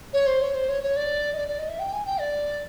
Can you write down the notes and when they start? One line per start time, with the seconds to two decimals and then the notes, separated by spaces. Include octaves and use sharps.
0.13 C#5
0.26 C5
0.41 C#5
0.54 C5
0.68 C#5
0.82 C#5
0.96 D5
1.32 D#5
1.37 D5
1.48 D5
1.58 D#5
1.68 E5
1.79 G5
1.92 G#5
2.05 G5
2.19 D5